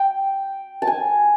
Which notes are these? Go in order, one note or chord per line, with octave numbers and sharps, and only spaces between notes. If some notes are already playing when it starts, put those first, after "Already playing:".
Already playing: G5
A5
G#5